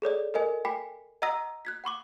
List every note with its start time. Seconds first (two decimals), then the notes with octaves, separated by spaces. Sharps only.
0.02 G#4 A4 C#5 D5
0.34 A4 A#4 D#5 G#5
0.65 G5 G#5 B5 D6 B6 C7
1.22 D#5 F#5 A#5 D#6 E6 A#6
1.65 F#6 G#6 B6
1.84 F#5 B5 C#6 D6